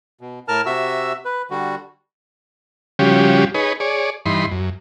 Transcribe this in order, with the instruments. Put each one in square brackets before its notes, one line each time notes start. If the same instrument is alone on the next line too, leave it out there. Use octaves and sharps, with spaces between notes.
[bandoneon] B2
A2 A#4 A5 F6
C3 F#4 E5 E6
B4
D3 G3 F#4
[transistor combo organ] C#3 F3 G3 C#4 F#4 G4
D#4 G#4 B4 C#5
G#4 C#5 D5
G2 E3 D#4 B5 C6
F#2